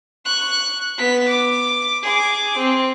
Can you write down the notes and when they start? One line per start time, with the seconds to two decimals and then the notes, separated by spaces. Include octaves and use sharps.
0.26 C#6 F#6
0.98 B3 B6
1.29 D6
2.03 G#4 D6
2.58 C4